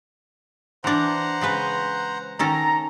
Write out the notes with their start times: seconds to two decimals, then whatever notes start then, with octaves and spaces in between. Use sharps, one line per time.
0.84 E3 D4 C5 F#5 A#5
1.41 C#3 G#3 B4
2.39 D#3 C#4 A4 A#5